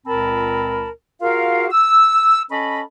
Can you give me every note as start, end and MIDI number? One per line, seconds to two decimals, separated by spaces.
0.06 0.88 37
0.06 0.88 46
0.06 0.88 60
0.06 0.88 70
0.06 0.88 81
0.06 0.88 83
1.21 1.66 65
1.21 1.66 66
1.21 1.66 68
1.21 1.66 70
1.21 1.66 77
1.72 2.41 88
2.51 2.81 61
2.51 2.81 69
2.51 2.81 75
2.51 2.81 83